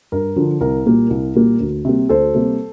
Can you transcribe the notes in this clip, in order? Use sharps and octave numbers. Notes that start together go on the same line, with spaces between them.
G2 A#4
D3 F3
C2 A#4
A#2 G3 A#3
C2
A#2 G3 A#3
D2
C3 G3 A#3
D2 A4 C5
C3 G3 A#3